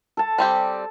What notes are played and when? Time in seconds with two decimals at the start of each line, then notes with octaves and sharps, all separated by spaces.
0.17 A4 A5
0.38 G3 C4 G4